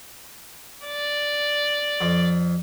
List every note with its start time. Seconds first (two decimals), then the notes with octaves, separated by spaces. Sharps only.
0.86 D5
2.01 F2